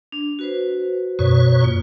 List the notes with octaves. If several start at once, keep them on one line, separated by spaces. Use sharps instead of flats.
D4
F#4 B4 C5
F#2 B2 C#5
A#3 F4